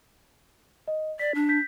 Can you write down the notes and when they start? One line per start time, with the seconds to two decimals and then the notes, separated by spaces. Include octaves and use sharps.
0.88 D#5
1.19 D5 B6
1.35 D4
1.49 G6 B6